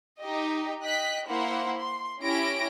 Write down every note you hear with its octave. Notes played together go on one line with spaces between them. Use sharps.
D#4 G4 D#5
D#5 G5 F#6 B6
A#3 E4 C5 F#5
C6
C#4 E4 G4 A#6 D7